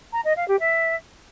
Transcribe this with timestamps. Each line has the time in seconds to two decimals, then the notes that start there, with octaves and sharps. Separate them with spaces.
0.12 A#5
0.24 D#5
0.36 F5
0.48 G4
0.59 E5